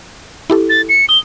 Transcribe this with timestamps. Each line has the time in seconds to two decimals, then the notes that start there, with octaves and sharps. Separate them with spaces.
0.50 E4 G4 A4
0.70 A6
0.89 C#7
1.09 D#6 G7